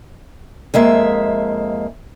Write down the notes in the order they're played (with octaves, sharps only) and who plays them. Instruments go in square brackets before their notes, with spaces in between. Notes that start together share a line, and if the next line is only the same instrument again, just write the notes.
[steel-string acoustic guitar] F2 G#3 A#3 E5